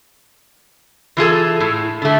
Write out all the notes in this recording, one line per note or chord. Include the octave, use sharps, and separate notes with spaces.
E3 F4 G#4 A4
A2
D3 A3